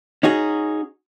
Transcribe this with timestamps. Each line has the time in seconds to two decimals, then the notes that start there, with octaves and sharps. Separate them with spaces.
0.23 C#4 D#4 F#4 G#4